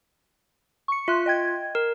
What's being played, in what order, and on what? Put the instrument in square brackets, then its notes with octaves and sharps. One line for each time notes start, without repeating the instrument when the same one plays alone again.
[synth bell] C#6 C#7
[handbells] F4 [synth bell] E5 C6 F#6
[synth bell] D#5 G5 G#6
[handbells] A#4